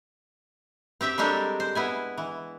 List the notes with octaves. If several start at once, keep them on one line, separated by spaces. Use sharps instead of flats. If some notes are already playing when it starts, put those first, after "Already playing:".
C4 G4 E5 G5
G3 G#3 D4 G4 A4 A#4
C5
B3 E4 G#5
E3